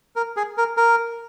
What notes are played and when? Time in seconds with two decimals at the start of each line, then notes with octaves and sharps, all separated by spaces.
0.16 A#4
0.36 G#4
0.58 A#4
0.77 A#4